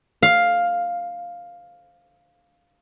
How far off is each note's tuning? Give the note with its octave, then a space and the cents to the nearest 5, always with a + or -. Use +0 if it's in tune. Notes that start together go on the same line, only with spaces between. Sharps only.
F5 +5